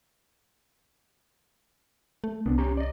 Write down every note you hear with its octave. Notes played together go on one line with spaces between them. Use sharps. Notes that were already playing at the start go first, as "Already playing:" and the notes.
A3
C2 B3 D4
C#4 G4 A#5
D5 D#5